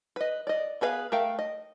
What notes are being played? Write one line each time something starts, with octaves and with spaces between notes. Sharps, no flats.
B4 D#5
D5 D#5
B3 G#4 B4 E5 F5
A3 A#4 E5 F5 G5
D#5